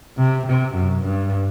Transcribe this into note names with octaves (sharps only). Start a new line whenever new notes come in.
C3
C3
F#2
G2